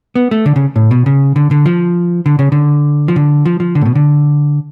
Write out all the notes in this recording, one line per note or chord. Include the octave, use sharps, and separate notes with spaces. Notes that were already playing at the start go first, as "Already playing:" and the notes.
B3
A3
D3
C#3
A2
B2
C#3
D3
D3
F3
D3
C#3
D3
F3
D3
F3
F3
D3
A2
B2
D3